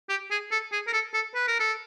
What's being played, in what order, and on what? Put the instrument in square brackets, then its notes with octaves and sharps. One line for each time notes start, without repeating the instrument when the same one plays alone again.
[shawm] G4
G#4
A4
G#4
A#4
A4
A4
B4
A#4
A4